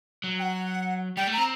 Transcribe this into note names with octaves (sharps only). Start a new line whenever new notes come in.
F#3
G5
F#5
G3 G5
A3
C4 A#5